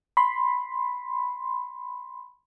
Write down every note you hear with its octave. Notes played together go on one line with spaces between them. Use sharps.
B5 C6